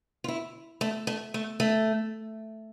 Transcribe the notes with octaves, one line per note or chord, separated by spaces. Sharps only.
F4
E4
A3
A3
A3
A3